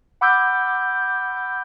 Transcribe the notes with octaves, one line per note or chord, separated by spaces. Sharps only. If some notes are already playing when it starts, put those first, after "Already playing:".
F#5 B5 D6 E6 G6